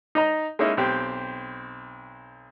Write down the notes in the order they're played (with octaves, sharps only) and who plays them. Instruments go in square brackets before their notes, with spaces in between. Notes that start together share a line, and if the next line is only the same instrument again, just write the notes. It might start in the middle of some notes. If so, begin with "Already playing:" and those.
[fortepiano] D#4 D#5 A#5
G#3 A#3 C#4 D#4 E4
B1 C4 G4